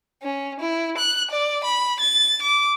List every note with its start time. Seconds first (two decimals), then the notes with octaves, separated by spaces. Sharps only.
0.23 C#4
0.60 E4
0.97 F#6
1.31 D5
1.64 B5
2.00 A6
2.42 D6